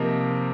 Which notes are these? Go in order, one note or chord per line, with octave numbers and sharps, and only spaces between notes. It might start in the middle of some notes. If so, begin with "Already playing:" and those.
Already playing: C3 F3 A#3 D#4 A#4